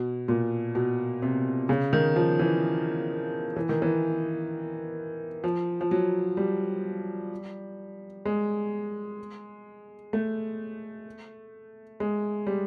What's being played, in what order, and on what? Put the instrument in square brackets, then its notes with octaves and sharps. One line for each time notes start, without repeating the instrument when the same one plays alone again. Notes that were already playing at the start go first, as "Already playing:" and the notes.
Already playing: [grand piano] B2
A#2
B2
C3
C#3
D#3
F3
E3
E3
D#3
E3
F3
F3
F#3
G3
G#3
A3
G#3
G3